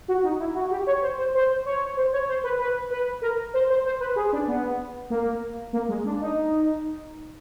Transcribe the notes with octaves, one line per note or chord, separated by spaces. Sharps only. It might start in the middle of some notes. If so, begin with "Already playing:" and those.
F#4
D#4
E4
F#4
G4
C#5
C5
C5
C5
C#5
C5
C#5
C5
B4
B4
B4
A#4
C5
C5
C5
B4
G#4
D4
B3
A#3
A#3
G#3
D4
D#4